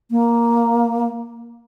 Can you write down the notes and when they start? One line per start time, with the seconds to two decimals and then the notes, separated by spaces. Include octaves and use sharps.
0.11 A#3